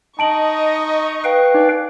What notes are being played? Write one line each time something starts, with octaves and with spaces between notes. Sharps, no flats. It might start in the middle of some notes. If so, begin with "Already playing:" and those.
D#4 D#5 A5 C#6 D7 F#7
B4 F5 G5
D#4 D5